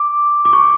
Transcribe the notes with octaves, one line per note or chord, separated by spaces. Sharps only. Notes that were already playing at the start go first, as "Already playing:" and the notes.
Already playing: D6
D6
C#6